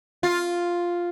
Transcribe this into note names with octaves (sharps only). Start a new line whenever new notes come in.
F4